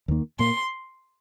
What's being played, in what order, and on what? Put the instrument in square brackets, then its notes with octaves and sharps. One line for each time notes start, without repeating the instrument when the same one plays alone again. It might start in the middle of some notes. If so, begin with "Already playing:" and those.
[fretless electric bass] D#2 D#3 A#3
[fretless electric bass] A#2 A#3 [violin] C6